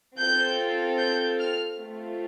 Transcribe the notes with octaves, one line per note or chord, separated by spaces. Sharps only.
C4 F4 A4 G6
G6
F6
A3 C4 F4